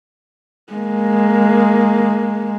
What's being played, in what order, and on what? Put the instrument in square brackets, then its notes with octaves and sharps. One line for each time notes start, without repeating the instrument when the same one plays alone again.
[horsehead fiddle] G#3 A#3